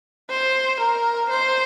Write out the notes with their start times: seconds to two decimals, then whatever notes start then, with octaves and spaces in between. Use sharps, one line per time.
0.30 C5
0.80 A#4
1.30 C5